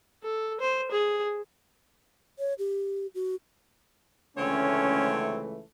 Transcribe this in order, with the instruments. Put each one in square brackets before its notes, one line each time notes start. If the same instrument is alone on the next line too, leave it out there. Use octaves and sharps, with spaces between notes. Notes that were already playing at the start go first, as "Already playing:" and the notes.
[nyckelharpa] A4
C5
G#4
[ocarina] C#5
G4
F#4
[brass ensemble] C#2 E3 A3 [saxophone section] D3 C4 C#5 [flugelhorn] C#4